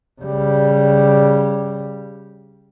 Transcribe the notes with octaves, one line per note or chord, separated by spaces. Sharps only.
C#3 G3